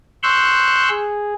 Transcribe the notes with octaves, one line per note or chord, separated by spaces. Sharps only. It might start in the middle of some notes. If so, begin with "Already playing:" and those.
C6 C#6 E6 F#6 G6
G#4